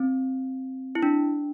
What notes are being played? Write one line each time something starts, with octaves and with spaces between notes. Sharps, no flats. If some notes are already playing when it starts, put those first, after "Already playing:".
Already playing: C4
E4
D4